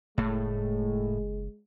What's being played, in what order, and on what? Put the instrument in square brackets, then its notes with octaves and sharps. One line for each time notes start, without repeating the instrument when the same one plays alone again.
[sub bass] F#1 [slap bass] A2 A3 [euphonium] G#3